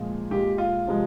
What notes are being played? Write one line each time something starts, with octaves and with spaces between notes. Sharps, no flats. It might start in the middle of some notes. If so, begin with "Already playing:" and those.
Already playing: A#2 F3 G#3
A#2 G#3 G4
F4
C3 F3 G#3